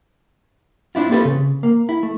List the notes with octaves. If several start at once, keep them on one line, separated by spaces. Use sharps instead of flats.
C4 D4 E4 F4
A#3 C4 G4 A4 B4
C#3
A#3
E4
A3